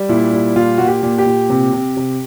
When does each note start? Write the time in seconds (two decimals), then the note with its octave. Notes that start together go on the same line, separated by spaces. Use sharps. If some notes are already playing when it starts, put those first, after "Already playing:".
Already playing: G3
0.09 A#2 E4
0.33 G3
0.56 A#2 F4
0.78 A#2 F#4
0.87 G4
1.03 A#2
1.18 G4
1.26 A#2
1.50 C3
1.73 C3
1.97 C3